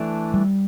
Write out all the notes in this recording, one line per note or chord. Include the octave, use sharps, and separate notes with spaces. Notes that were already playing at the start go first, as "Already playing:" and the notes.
Already playing: E3 A3 D4
G3